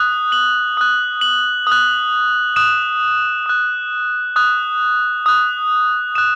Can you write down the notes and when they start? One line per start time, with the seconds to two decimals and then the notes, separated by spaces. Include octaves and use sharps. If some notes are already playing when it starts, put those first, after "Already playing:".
Already playing: D#6 F#6
0.32 F#7
0.77 D#6 F#6
1.21 F#7
1.67 D#6 F#6
2.56 D#6 F#6 E7
3.46 D#6 F#6
4.36 D#6 F#6
5.26 D#6 F#6
6.15 D#6 F#6 E7